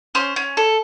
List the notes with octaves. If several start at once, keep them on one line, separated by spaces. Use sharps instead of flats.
C#4 C5
C#4
A4